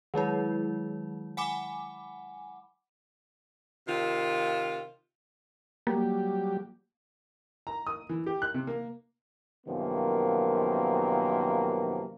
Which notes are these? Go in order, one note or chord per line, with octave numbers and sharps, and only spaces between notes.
D#3 F#3 G#3 E4
F#5 G#5 B5 D6
C3 D#3 F4
F#3 G3 A#3 G4
A#5
D#6
E3
G4
F#6
C3
A#3
F#2 C3 D#3 F3 A#3 B3